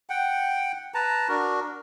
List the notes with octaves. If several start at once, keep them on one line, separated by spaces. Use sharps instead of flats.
F#5 G5
B4 A5 A#5
D4 F#4 A#4